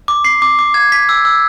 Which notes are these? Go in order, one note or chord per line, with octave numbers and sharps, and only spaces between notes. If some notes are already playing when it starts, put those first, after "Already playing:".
D6
C7
D6
D6
G#6
B6
E6
E6